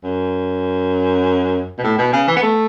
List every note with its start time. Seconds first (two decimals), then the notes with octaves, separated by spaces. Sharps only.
0.04 F#2
1.78 B2
1.83 A2
1.98 B2
2.13 C#3
2.28 E3
2.36 B3
2.42 A3